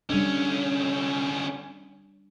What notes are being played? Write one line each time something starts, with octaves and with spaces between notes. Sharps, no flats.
D3 G3 C#4 D4